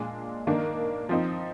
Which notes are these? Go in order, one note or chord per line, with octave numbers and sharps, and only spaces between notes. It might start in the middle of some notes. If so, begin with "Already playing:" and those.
Already playing: A#2 G#3 D4
D#3 A#3 D4
F3 C4 D#4